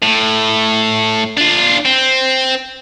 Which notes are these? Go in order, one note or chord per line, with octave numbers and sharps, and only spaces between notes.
A2
D4 F4
C4